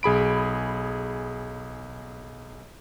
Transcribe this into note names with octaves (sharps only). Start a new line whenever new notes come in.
B1 G#4 B5 D7